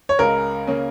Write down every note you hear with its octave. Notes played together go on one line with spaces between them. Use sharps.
C#5
C#2 C#3 G#3 A#4
C#3 A#3 C#4